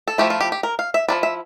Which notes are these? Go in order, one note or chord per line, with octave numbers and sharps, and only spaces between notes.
A4
F3 A3 E4 G4
F4
G4
G4
A#4
F5
E5
F3 A#3 E4 D5
E5